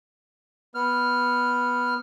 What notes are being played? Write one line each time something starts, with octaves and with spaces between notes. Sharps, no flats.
B3 F6